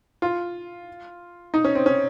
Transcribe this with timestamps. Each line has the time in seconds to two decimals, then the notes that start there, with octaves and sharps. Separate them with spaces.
0.22 F4
1.54 D#4
1.64 C#4
1.75 C4
1.86 C#4